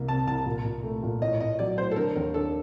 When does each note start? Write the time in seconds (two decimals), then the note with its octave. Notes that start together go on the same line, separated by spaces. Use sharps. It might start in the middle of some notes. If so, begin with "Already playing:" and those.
Already playing: C2 A#3
0.08 C3 A5
0.27 C2 A5
0.46 A#2
0.64 A#2
0.83 A3
1.03 A#2
1.21 A2 D#5
1.40 A2 D#5
1.59 F#3 D5
1.77 A2 C5
1.91 A4
1.96 D3 A#4
2.16 D#2 A#4
2.34 D4 A4